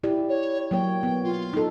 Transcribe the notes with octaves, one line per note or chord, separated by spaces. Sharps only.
E4 G4 D5
C#5
F#3 A#3 C#5 G5
B3
F4
D#4 A4